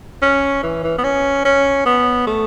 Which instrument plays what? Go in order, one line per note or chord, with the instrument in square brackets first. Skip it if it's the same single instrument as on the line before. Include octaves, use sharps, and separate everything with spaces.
[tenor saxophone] C#4
E3
E3
B3
C#4
C#4
B3
A3